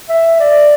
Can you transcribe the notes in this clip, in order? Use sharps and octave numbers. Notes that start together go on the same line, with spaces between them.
E5
D5